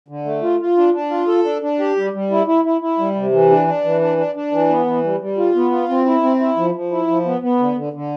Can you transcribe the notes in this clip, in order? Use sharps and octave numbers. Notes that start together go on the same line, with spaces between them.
D3
A3
F4
F4
D4
D4
F4
A4
D4
D4
G4
G3
G3
E4
E4
E4
E4
G3
C3
E3
D4
D4
E3
D4
D4
D4
E3
B3
E3
G3
G3
F4
B3
F4
C4
E4
C4
E4
F3
F3
E4
F3
B3
B3
D3
D3
D3